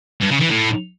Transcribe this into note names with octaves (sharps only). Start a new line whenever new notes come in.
G2
C#3
E3
A2